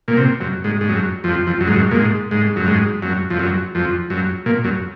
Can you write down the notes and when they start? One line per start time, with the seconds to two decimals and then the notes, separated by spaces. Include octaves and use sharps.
0.08 A#2
0.17 C3
0.41 F#2
0.64 G#2
0.81 G#2
0.89 F#2
1.24 F2
1.47 F2
1.60 F#2
1.67 G#2
1.76 F#2
1.91 A#2
1.96 G#2
2.31 G#2
2.56 F#2
2.68 G#2
3.02 F#2
3.30 F2
3.39 F#2
3.75 F2
4.10 F#2
4.46 A#2
4.64 F#2